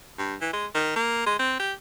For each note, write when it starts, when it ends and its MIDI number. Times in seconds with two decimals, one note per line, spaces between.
0.18 0.35 43
0.41 0.53 52
0.53 0.66 56
0.74 0.94 51
0.96 1.23 58
1.26 1.39 56
1.39 1.56 60
1.59 1.73 67